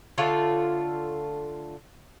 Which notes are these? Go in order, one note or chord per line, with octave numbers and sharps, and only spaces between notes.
D3 A3 F4 C#5